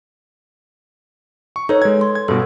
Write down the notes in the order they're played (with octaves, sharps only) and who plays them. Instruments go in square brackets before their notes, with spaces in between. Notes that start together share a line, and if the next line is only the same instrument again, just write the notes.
[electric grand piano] C#6
[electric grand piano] D#4 [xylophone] A4 B4 C#5
[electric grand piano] G#3 G#6
[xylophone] C6
[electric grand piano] G#6
[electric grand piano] G2 B2 [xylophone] A4